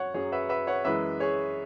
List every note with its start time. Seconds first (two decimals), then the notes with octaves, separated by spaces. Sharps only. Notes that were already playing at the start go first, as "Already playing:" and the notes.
Already playing: F#2 F#3 C#5 F#5
0.14 F#2 F#3 G#4 C#5
0.32 B4 E5
0.49 B4 E5
0.67 C#5 F#5
0.85 F#2 E3 G#3 B4 E5
1.20 G#4 C#5